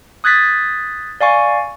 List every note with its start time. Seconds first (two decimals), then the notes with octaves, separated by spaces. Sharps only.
0.24 D#6 F#6 G#6 A6 B6
1.21 D5 F5 G#5 C#6